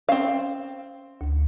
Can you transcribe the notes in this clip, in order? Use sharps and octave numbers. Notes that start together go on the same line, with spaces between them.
C4 C#4 F5
D2